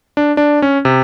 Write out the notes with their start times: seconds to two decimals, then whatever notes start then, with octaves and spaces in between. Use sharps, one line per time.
0.17 D4
0.37 D4
0.62 C#4
0.85 C3